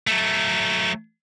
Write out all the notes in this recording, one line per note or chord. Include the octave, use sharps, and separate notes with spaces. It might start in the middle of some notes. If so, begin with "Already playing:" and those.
F#3 A3